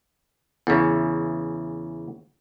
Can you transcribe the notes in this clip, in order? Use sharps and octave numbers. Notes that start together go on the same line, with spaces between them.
E2 C#3